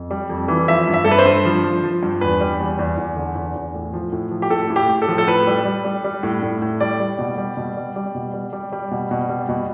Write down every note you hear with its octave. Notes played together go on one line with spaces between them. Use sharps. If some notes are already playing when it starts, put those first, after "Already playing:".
Already playing: F2
G3
F2
E3
F3 E5
G2
E5
G2 A4
B4
C5
G2
F3
F3
F3
G2
E2 B4
G3
E2
E2
E2
D3
E2
E2
A2
F3
A2
F3
G4
A2 A4
A2
G4
A2
A4
F3
A4
A2 B4
G3
G3
G3
G3
A2
A2
A2
G3 D5
G3
B2
G3
B2
G3
G3
B2
G3
G3
G3
B2
B2
G3
B2